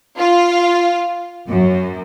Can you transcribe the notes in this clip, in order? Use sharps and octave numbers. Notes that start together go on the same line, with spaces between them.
F4
F#2